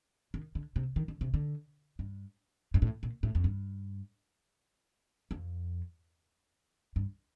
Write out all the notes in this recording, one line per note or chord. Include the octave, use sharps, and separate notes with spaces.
D#3
D3
C3
D#3
D3
C3
D3
G2
G2
A2
A#2
A2
F2
G2
F2
G2